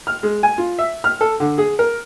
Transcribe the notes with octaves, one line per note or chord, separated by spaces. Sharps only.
F6
G#3
G#5
F4
E5
F6
A4
D3
G#4
A#4